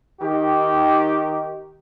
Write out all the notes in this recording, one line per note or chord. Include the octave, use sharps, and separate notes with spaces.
D#3 D#4 G4